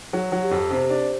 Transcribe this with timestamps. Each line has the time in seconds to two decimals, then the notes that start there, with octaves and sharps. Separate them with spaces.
0.13 F#3 G#4
0.32 F#3
0.42 G4
0.51 F2
0.71 C3 C5
0.90 D4